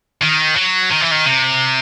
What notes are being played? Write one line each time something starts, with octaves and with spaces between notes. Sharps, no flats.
D#3
F#3
D#3
E3
D#3
C3